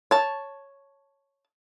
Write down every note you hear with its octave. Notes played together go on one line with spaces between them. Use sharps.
C#5 A5